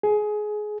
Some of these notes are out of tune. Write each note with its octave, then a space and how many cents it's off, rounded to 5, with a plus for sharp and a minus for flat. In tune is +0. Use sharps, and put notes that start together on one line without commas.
G#4 +20